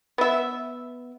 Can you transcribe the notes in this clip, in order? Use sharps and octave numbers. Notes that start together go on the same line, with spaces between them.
B3 E5